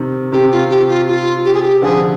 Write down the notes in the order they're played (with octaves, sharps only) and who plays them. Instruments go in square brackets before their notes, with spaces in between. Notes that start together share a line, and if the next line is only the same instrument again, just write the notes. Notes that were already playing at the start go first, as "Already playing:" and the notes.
Already playing: [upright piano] C3 D#3
[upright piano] C3 D#3 [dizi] G4
[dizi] F4
G4
F4
F4
G4
G#4
G4
[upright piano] D3 F3 [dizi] G#4